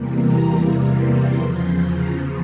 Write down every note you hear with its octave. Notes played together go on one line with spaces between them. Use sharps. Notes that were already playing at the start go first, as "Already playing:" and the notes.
Already playing: E2 C3 E3 G3 A#3
A#5
C6
E2 C#3 F3 C6
C6
A#5